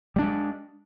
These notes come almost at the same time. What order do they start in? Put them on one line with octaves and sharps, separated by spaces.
G3 D4 G#3